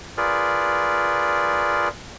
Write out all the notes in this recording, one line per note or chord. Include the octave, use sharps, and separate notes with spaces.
F4 G#4 A#4 B4 D5